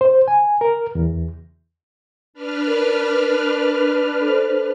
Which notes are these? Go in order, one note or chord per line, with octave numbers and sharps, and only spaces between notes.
C5
G#5
A#4
E2
D4 B4 F6
A#4
A4 C5